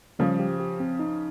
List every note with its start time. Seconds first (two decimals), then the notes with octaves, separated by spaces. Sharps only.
0.19 C#3 F3 G3
0.39 G4
0.60 G4
0.80 C4
0.99 D#4